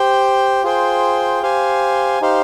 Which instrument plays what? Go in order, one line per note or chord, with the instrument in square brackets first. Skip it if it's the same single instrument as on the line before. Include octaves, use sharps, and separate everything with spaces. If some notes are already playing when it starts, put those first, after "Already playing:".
Already playing: [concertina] G4 C5 G5
F4 G#4 C5 G5
G4 C5 F5 G#5
D#4 G4 C5 F5